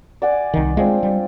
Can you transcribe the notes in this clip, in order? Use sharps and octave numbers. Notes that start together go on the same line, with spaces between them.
D5 F#5 G#5
C2 D#3
G#3 C4 D4 F4
G3